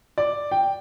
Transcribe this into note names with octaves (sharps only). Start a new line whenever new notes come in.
D5
G5